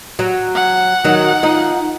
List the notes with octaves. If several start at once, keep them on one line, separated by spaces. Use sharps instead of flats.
F#3
F#5
D#3 F#3
F3 D#4